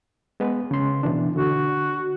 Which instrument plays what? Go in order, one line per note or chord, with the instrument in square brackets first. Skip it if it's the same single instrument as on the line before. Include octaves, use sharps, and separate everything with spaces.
[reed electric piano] G#3 B3 B4
C#3 C6
B2 E3 D4
[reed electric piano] D3 [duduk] F#4